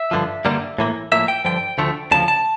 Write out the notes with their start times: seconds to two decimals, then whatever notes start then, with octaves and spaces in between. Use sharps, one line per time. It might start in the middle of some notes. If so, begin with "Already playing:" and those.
Already playing: E5
0.11 G2 D3 F3
0.45 G2 D3 G3 A#3
0.78 A2 E3 A#3
1.12 A2 F3 A#3 E5
1.28 G5
1.45 G2 D3 F3 G5
1.78 D2 D3 F3 A3
2.11 D2 C#3 F3 A5
2.28 A5